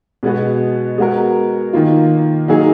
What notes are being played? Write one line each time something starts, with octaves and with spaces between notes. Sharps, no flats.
B2 G#3 B3 F#4
G#3 B3 F#4 A#4
D#3 A#3 F4
F#3 A#3 D#4 G#4